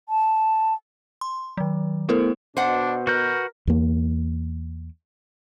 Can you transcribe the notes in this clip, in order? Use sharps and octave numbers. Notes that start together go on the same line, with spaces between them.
A5
C6
D#3 F#3
A3 B3 E4 A4 A#4 C5
B2 D4 C5 F#5
F#4 A#4 B4 G6
E2 A#3